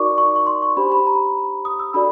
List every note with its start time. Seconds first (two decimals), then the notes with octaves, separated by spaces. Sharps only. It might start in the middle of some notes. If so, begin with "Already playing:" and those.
Already playing: D#4 F#4 A#4 D5 C#6 D6
0.18 C#6
0.36 C#6
0.47 C6
0.62 C#6
0.77 D4 G4 C5 B5
0.92 B5
1.07 A#5
1.65 D#6
1.80 E6
1.94 D4 F#4 A4 D5 B5